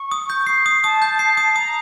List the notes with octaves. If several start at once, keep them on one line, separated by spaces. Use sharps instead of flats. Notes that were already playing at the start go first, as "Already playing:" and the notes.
Already playing: C#6
D#6
G6
C7
D#6
A5 D#6
G6
C7
D#6
A#5 D#6